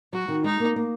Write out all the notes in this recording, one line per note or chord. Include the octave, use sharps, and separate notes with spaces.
F#3 F#4
D#3
G#3 D#4
A#3
A#3